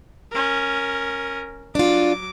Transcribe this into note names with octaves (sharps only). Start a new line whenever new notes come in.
C#4 A#4
F#3 D4 F4 D6